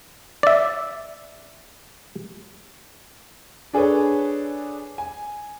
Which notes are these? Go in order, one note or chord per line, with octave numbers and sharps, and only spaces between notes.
D5 E5
D4 G#4 A4 B4 C#5
G#5